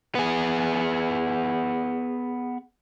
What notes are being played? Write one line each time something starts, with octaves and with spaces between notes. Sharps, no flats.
B3 G#4